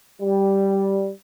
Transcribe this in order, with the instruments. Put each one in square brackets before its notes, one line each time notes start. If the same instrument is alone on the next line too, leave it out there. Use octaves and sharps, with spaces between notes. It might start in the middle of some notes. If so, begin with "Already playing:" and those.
[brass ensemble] G3